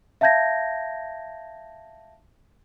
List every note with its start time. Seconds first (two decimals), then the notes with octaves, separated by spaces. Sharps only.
0.21 E5 F5 A5 G6 G#6 A#6